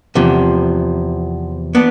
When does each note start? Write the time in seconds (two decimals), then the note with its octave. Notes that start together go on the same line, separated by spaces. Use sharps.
0.15 E2 C3 F3
1.75 B3 D4